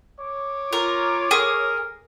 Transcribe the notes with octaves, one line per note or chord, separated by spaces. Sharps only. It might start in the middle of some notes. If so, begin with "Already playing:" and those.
C#5 D6
F4 A#4
G#4 A#4